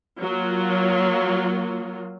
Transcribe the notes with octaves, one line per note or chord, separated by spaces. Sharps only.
F#3 A#3 F4